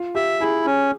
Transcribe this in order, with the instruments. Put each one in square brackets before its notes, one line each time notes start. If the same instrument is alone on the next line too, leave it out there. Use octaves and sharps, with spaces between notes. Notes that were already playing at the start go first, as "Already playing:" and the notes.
Already playing: [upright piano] F4
[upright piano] G4 [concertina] E5
[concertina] E4 [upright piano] G#4
[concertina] C#4